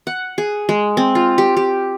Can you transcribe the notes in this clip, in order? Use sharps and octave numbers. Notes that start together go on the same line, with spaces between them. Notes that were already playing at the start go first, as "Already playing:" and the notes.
F#5
G#4
G#3
C4
F4
G4
G4